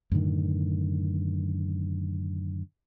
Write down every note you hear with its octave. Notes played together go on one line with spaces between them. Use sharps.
F#2 A2 D3 D#3